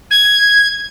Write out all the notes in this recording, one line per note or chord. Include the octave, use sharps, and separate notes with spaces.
G#6